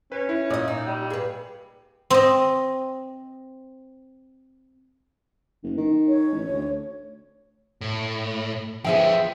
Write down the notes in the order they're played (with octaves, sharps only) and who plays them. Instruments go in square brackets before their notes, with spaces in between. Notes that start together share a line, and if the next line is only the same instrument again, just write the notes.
[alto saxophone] C#4 [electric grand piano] B4
[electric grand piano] E4
[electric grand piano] A#2 [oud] D5 D#5
[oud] D#4
[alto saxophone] G3
[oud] G#4 B4
[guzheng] C4 D#5
[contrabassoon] F#1
D#3
[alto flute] C#5
[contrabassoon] A1
D2
[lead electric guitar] A2
[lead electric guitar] F3 B3 [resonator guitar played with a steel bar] G#4 E5 G5